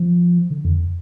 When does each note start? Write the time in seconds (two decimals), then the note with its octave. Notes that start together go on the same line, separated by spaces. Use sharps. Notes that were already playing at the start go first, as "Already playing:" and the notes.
Already playing: F3
0.50 D3
0.65 F2